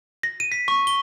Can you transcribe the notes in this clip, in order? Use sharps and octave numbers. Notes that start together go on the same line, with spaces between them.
A#6
D#7
B6
C#6
G7